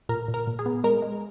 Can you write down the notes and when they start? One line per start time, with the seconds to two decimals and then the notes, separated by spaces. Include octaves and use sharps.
0.09 A#2 A#4
0.28 A#2
0.34 A#4
0.47 A#2
0.59 G#4
0.66 B3
0.84 G#3 A#4
1.02 G#3